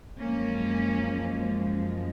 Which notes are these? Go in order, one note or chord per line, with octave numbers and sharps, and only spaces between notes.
F#2 F3 G#3 A#3 C#4